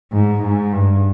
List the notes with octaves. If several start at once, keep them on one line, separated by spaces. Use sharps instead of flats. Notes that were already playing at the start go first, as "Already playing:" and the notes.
G#2
G#2
G2